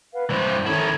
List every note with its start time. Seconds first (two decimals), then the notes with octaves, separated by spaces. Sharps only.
0.13 B4 F5 F#5
0.29 G2 E3 C5
0.66 D#3 C#4 E4 A4 G#6